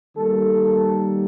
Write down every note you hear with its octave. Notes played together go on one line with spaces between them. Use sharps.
D#3 G3 A#3 A4